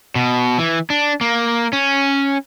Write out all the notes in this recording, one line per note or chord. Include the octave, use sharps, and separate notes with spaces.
B2
E3
D4
A#3
C#4